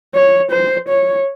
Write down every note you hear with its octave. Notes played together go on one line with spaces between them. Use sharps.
C#5
C5
C#5